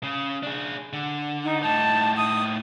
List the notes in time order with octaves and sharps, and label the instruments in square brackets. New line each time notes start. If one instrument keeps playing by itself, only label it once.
[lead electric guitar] C#3
D4 G#4
D3
[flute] D#4
[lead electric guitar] A2 D#4 [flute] A5
[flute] D#6